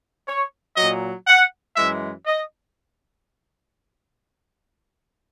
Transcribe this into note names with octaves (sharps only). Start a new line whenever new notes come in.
C#5
A#2 F#3 D#5
F#5
F#2 E3 G#3 E5
D#5